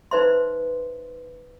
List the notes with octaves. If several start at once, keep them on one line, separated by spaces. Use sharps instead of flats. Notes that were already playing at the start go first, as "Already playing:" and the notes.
D#4 B4 C5 E5 C6